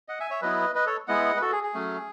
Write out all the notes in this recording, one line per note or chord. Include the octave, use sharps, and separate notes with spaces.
D#5 F#5
E5 G#5
C#5 E5
F#3 B3 E4 B4 D#5
B4 D#5
A4 C#5
G#3 B3 E4 D#5 F#5
B4
F#4 A4
G#4
G#4
F#3 A3 C#4